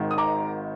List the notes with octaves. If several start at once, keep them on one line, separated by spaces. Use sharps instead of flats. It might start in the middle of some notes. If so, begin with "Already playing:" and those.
Already playing: G#1 G#2 D#3
D#6
A#5 D6